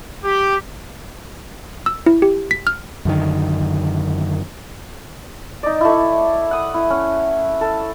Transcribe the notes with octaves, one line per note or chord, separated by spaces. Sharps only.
G4
E6
E4
G4
B6
F6
F#2 D3 D#3
D#4 D5
A3 E4
F#5 D#6
E4
C#4 F#5
A4